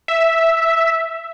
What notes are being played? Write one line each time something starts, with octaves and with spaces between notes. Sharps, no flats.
E5